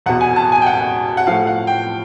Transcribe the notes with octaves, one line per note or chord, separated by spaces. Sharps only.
E2 B2 F#5
G#5
A5
G#5
G5
F#5
F#5
A2 F3 F5
F#5
G5